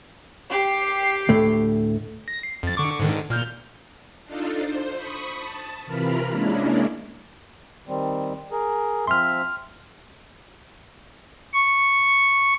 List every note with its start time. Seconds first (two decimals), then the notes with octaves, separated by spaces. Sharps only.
0.50 G4 C7
1.29 D2 A2 A3
2.28 A#6
2.43 C7
2.63 F2 A6
2.77 D3 C#6 D6
3.00 G#2 D3 D#3
3.30 A#2 F6 G6
4.24 D4 D#4 F4 A4
4.56 C5
4.94 B5 C#6 D#6
5.38 A5
5.85 C3 E3 F4 A#4 B5 F6
6.30 G#3 A#3 C#4 D4 E4
7.88 D#3 G3 C4
8.52 G#4 A#4
9.07 F3 C4 E5 C6 F6
11.53 C#6